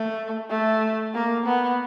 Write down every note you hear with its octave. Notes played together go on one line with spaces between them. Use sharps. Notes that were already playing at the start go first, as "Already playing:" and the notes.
Already playing: A3
A3
A#3
B3